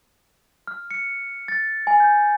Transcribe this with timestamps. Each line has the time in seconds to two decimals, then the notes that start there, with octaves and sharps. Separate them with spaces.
0.67 F6
0.91 C#7
1.48 A6
1.87 G#5
2.00 G6